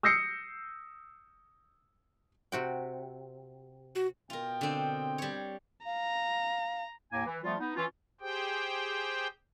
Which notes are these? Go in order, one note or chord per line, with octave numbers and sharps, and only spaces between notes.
D#6 E6 G6 A#6 C7 C#7
C3 F#4 G5
F#4
B2 F4 A#4 D#5 G5
D3 C4
G3 C#5
F5 A#5
D#2 A2 A#3 G#5
E3
F3 G3 A3 B3 F4
B3 D#4
E3 C#4 F4
G4 G#4 C5 G5